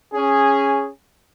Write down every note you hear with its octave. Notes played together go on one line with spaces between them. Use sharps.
C#4 G#4